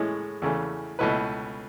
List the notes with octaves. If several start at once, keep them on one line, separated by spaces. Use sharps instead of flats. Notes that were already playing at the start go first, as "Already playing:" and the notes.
Already playing: A2 E3 G#3 C#4 E4
E2 C#3 E3 A3
C#2 B2 A3 E4 B4